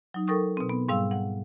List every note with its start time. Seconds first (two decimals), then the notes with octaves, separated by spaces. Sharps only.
0.14 F#3 D#4
0.27 A4 A#4 G5 C#6 D#6
0.57 B2 C4
0.69 B3
0.89 G#2 G3 F5 E6
1.11 F#5